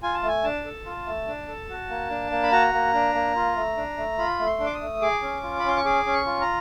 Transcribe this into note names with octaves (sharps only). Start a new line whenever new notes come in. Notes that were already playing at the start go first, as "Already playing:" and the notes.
F4 G#5
A5
A3 G#5
D4 A5
A4
F4
A3
D4
A4
F#4
A#3
D4
A#3
B5
F#4 A#5
A#3
D4
A#3
F4
A3
D4
A3
F4 B5
A3
C6
D4
D6
D#6
A3
G#4 D6
C#4
F4
B5
C#4 C6
C#6
G#4 D6
C#4
C#6
F4
A#5